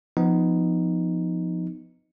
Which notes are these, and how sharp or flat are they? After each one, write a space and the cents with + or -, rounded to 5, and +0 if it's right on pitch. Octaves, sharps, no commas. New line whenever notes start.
F3 +0 B3 +20 D#4 +0